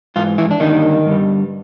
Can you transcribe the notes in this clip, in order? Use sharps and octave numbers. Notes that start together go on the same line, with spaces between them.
G#2 E3 F4
E3 E4
D4
G2 D3 D#3 G3 A#3 D#4
G2 D3 G3